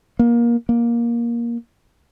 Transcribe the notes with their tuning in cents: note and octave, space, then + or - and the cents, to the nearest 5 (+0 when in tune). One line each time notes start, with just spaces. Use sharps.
A#3 +20
A#3 +15